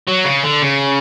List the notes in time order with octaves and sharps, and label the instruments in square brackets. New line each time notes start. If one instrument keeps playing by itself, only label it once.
[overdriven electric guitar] F#3
C#3
D3
C#3